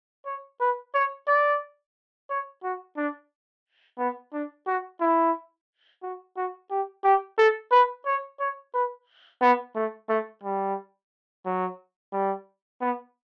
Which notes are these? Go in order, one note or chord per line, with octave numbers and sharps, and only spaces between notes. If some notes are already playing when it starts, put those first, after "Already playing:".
C#5
B4
C#5
D5
C#5
F#4
D4
B3
D4
F#4
E4
F#4
F#4
G4
G4
A4
B4
C#5
C#5
B4
B3
A3
A3
G3
F#3
G3
B3